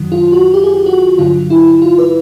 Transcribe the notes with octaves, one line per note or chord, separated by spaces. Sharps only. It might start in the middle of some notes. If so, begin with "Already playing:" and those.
Already playing: F#2 D#3 F#3
F4
F#4
G4
G#4
G4
F#4
G2 D3 F#3 F4
E4
F4
B4